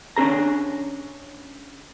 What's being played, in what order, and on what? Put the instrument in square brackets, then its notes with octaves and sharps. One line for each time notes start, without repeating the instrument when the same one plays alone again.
[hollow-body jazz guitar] C#4 D4 G#4 A#5